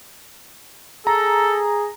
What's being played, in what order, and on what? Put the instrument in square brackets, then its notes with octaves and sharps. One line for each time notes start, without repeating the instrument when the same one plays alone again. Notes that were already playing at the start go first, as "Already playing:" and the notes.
[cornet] G#4 [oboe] A4 [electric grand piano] A#5